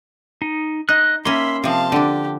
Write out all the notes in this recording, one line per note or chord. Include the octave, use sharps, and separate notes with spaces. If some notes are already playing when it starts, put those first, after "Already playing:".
D#4
D#4 D#5 F#6
A#3 C#4 E5 B5 C6
C3 F3 F5 A5
D3 D4 G4